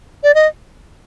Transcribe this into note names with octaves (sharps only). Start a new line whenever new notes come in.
D5
D#5